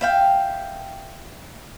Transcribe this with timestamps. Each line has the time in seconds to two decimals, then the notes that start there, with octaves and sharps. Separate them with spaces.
0.01 E5 F5 G5